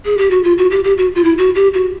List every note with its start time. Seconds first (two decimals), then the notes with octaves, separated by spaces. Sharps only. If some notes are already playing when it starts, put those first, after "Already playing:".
0.05 G#4
0.17 G4
0.30 F#4
0.43 F4
0.57 F#4
0.70 G4
0.84 G4
0.97 F#4
1.15 F4
1.24 E4
1.38 F#4
1.55 G4
1.73 F#4